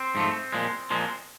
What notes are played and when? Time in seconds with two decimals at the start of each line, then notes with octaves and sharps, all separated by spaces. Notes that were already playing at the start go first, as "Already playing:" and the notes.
Already playing: C4
0.15 G#2 F3 A3
0.52 A#2 F3 G#3
0.90 A#2 F3 G#3